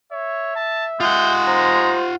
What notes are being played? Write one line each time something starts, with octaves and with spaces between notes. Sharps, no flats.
C#5 E5
A5
G#3 F4 F#5 G6
C5 A#5